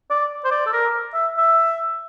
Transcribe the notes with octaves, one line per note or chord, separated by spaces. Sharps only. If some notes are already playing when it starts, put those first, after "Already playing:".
D5
C5
D5
A4
A#4
E5
E5